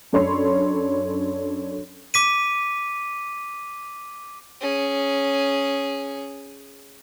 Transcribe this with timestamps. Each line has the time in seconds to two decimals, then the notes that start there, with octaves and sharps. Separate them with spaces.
0.13 F#2 D4 A4 C#5 B5 C6
2.14 D6 B6 D#7
4.61 C#4 G#4